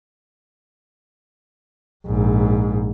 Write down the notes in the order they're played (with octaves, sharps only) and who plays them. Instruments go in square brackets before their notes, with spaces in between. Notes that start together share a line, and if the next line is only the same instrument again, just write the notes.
[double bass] A#1 G#2